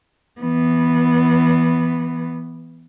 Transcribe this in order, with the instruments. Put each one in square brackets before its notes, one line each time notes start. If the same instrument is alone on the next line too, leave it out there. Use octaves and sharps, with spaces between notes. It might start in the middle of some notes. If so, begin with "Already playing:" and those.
[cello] E3 B3